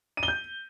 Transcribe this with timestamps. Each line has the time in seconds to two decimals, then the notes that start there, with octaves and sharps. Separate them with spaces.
0.17 D#7
0.23 G7
0.28 G6